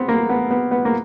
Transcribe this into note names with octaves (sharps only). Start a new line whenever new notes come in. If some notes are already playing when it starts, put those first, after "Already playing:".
Already playing: B3 C4
A#3
B3
B3
B3
A#3